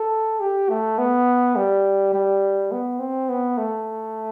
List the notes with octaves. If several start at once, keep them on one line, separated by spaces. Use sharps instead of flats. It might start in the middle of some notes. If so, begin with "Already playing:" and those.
Already playing: A4
G4
A3
B3
G3
G3
B3
C4
B3
A3